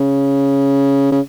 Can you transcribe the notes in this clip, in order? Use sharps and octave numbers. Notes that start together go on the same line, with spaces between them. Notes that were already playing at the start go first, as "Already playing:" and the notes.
Already playing: C#3
C#3